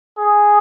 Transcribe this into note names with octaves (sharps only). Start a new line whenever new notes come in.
G#4